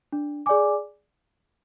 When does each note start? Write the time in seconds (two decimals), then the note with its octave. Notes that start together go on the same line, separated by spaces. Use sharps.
0.12 D4
0.46 G#4 D5 G#5 D6